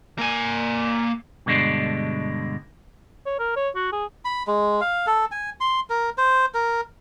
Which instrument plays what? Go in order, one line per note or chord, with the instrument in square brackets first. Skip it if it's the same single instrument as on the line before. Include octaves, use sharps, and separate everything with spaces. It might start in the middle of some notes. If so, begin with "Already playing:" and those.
[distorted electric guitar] A#3 G#5
[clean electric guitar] G2 B2 D3 G#3 D4
[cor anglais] C#5
A#4
C#5
F#4
G#4
[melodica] B5
G#3
F5
A4
G#5
C6
A#4
C5
A#4